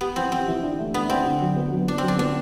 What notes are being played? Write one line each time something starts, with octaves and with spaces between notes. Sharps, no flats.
B3 G4
E3 C4
E3 C4
E3
D4
A3
A3 B3
C4 D4
D3
F#3
B3
F#3
B3 D4
F#3 C4
D4
B3 D4